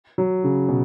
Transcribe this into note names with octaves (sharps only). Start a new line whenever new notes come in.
F#3
C#3
B2